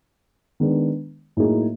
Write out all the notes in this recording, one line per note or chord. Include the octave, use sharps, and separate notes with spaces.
D#3 G#3 B3 D4
A2 F#3 A#3 D#4 G#4